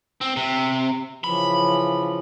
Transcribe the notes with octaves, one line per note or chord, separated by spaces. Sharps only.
C4
C3
C#3 E3 F3 B5